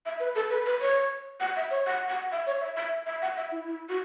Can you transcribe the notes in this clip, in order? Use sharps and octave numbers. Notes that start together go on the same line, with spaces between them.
E5
B4
A4
B4
B4
C#5
F#5
E5
C#5
F#5
F#5
E5
C#5
E5
E5
E5
F#5
E5
E4
E4
F#4